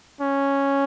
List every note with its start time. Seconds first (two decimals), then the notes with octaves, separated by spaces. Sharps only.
0.21 C#4